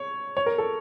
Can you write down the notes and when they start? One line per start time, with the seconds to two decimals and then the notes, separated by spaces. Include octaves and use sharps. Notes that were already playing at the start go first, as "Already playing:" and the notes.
Already playing: C#5
0.37 C#5
0.46 A#4
0.58 A4